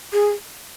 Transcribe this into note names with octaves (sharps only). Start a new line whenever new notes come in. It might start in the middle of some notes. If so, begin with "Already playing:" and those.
G#4